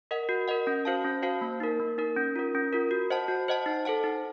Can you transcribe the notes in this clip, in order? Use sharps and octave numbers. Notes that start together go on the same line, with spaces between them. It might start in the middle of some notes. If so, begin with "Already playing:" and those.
A#4 D#5 F#5
F#4
A#4 D#5 F#5
C#4
F#4 C5 F5 A5
C#4
F#4 C5 F5 A5
A#3
D#4 A#4
A#3
D#4 A#4
C#4
F4 A#4
C#4
F4 A#4
F#4
C5 D#5 F#5 A5
F#4
C5 D#5 F#5 A5
D#4
A4 C5 F#5 A5
D#4